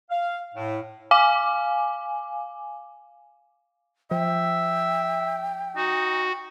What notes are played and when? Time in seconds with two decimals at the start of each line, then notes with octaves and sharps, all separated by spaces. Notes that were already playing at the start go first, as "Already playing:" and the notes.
0.10 F5
0.55 A2
1.11 F5 G#5 D6
4.11 F3 E5 G5
5.76 D#4 F#4